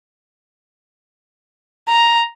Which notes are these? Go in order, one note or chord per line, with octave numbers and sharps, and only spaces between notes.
A#5